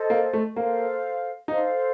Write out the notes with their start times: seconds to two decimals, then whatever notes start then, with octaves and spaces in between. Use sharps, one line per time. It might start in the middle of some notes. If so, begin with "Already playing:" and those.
Already playing: A4 C5 D#5
0.10 A#3
0.33 A3
0.56 A#3 A4 C5 F5
1.48 D#4 A4 C5 F5